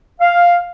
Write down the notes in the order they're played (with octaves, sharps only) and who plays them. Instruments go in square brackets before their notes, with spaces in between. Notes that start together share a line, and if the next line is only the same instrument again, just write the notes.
[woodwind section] F5